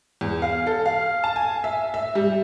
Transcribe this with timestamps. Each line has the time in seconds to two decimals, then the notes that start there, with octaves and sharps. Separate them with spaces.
0.21 E2
0.42 F5
0.67 A4
0.86 F5
1.24 A5
1.36 G#5
1.64 E5
1.94 E5
2.15 G3